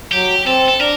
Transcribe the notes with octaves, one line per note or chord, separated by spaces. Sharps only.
F#3 G4
C4 A4
A4
D4 A#4